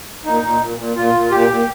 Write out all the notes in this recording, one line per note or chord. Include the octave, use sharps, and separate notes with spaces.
A#2 D#4
A#2
A#2
A#2
A#2 F4
A#2
A#2 G4
A#2